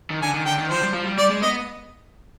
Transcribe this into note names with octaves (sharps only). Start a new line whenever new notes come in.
D#3
D3 G#5
D#3
D3 G5
D#3
F3 C5
G3
F3
G3
G3 D5
G#3
B3 D#5